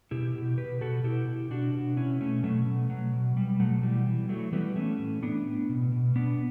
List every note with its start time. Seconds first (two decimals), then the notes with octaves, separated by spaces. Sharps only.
0.11 B2 E4 G4
0.34 B2
0.58 B2 G4 B4
0.81 B2 F#4 A4
1.04 B2 E4 G4
1.28 B2
1.51 B2 D4 F#4
1.74 B2
1.97 B2 C#4 E4
2.20 B2 A3 C#4
2.44 B2 F#3 A3
2.66 B2
2.90 B2 F#3
3.13 B2
3.36 B2 G3
3.60 B2 F#3 A3
3.83 E3 G3
4.06 E3
4.29 E3 F#3 A3
4.52 E3 G3 B3
4.76 E3 A3 C#4
4.99 A2
5.22 A2 B3 D4
5.46 A2
5.69 B2
5.92 B2
6.16 B2 B3 D4